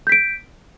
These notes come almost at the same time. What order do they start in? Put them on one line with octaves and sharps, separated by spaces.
G6 B6 D7